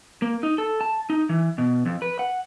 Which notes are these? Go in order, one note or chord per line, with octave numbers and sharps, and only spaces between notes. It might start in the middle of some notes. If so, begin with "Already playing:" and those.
A#3
D#4
A4
A5
D#4
E3
B2
F2
B4
F#5